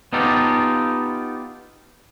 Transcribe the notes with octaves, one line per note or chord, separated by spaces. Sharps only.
B3 D#4 F4 G4 A4